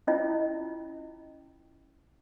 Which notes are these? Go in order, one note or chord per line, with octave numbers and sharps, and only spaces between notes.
C#4 E4 F4 D#5